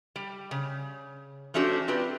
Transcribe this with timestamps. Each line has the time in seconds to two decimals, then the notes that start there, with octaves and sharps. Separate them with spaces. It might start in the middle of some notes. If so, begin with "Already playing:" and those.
0.16 G3
0.51 C#3
1.54 F3 A3 C#4 D4 F#4 G4
1.88 C4 F4 G4 B4